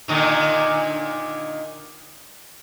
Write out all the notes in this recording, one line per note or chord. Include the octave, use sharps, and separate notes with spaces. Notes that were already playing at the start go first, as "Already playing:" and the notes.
A#2 D3 D#3